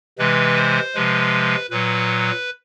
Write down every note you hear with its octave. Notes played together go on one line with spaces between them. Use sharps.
C3 E3 G#3 B4
C5
C3 F3 G#3 B4
A#2 F#3 B4